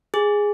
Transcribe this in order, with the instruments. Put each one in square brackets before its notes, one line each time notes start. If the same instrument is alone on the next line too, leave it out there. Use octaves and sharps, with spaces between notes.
[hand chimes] G#4